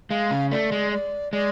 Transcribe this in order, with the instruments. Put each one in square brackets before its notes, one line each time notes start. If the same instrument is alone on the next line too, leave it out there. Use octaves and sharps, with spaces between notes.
[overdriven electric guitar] G#3 [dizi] F5
[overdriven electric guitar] C#3
[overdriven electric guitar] A3 [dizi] D5
[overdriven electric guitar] G#3
[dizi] D5
[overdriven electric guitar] G#3 [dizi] D5